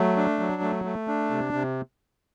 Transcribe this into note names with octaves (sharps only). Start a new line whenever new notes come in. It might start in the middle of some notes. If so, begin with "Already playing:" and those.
Already playing: F#3 A3
D4
F#3
A3
A3
D4
C3
C3